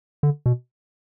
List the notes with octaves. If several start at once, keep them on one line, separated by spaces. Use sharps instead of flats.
D3
B2